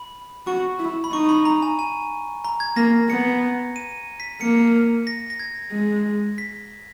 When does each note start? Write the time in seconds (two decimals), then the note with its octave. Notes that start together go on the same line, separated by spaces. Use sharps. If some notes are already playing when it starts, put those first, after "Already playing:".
Already playing: B5
0.47 F#4 C#6
0.79 E4
1.04 B5
1.13 D#4 C#6
1.29 B5
1.45 A#5
1.62 G#5
1.79 G#5
2.45 A#5
2.60 G#6
2.76 A#3 A#6
3.10 B3 C#7
3.76 D#7
4.20 B6
4.41 A#3 C#7
5.07 A#6
5.30 A#6
5.40 G#6
5.72 G#3
6.38 B6